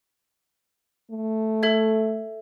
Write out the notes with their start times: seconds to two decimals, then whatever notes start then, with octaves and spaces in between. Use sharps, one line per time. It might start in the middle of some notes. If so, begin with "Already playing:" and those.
1.11 A3
1.63 A4 E5 G#6